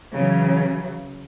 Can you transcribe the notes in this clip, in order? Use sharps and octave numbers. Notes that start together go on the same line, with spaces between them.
C#3 E3 F#3